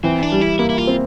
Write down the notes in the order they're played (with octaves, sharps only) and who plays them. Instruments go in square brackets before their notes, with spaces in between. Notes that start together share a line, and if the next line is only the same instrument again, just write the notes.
[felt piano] E3 [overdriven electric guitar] C4
[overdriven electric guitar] D4
[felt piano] G3
[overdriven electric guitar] E4
[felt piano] A#3 [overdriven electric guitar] E4
[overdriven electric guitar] E4
F4
[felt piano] C4